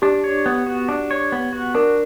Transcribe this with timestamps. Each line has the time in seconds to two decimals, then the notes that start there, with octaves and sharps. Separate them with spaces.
0.02 D4 G4
0.24 C#5
0.46 B3
0.67 F#4
0.89 D4
1.11 C#5
1.32 B3
1.53 F#4
1.75 D4 A#4